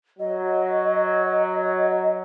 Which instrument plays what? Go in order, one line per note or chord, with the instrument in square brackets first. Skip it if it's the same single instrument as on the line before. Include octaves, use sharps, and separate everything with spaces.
[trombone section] F#3 [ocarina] D#5